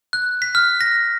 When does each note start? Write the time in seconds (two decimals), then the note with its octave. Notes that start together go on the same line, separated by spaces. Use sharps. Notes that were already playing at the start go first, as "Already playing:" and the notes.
0.13 F#6
0.42 B6
0.55 F6
0.81 A#6